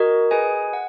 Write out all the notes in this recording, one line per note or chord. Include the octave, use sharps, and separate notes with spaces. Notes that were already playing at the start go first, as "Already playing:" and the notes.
Already playing: F#4 A#4 D#5
G#4 B4 D#5 G#5
F#5